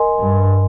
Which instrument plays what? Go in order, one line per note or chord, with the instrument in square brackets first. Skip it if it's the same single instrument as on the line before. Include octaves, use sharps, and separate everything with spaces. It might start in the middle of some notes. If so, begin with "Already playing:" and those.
Already playing: [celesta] A#4 D#5 G#5 C6
[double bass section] G2